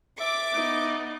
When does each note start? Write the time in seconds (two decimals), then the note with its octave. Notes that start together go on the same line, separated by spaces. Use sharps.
0.20 D5 E5 D6
0.53 B3 D#4